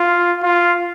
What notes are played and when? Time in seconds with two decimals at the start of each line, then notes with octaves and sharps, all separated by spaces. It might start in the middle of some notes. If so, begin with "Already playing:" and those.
Already playing: F4
0.43 F4